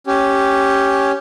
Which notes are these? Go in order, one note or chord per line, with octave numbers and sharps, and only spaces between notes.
C#4 G4